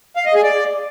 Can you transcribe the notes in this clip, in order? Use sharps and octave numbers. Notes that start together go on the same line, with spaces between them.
F5
D#5
G#4
D5